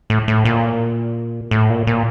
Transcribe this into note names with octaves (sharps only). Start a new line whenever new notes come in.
A2
A2
A#2
A2
A#2
A#2